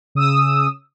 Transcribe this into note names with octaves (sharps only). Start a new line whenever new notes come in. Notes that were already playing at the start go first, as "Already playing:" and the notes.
C#3 D#6 E6